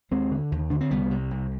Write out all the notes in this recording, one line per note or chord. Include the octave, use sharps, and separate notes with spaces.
D#2 G#3 C4
D3
D#2
D3 D4
C4
C2 G3 B3
C3
C2